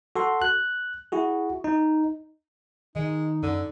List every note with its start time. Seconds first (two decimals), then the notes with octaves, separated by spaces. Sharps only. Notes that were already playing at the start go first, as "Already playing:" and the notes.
0.16 F#4 A4 C6
0.42 F#6
1.12 E4 F#4 G#4
1.64 D#4
2.96 D#3 G#3 D#4
3.43 F#2 D3 C#4